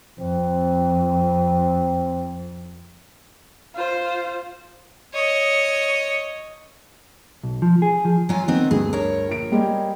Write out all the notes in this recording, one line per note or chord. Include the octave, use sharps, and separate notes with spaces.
F2 C4
F4 C5
C#5 D#5
B1
F3
G#4
F3
F#3 F4 G#5
D#3 B3 C4
D2 G2 G#4
A#4 C#5
A#1 D7
G3 G#3 G4